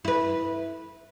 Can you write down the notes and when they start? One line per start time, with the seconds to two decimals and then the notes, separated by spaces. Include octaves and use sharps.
0.05 E4 B4